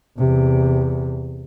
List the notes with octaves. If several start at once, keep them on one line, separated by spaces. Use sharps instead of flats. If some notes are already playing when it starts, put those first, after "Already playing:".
E2 C3